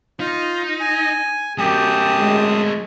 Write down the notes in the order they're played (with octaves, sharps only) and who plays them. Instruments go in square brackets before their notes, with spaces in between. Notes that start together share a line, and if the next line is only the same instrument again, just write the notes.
[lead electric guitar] D#4 [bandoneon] F4 F5
[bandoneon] G#5
[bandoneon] F#2 A5 D#6 [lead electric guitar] F#3 A3 [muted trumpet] G4
[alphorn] G#3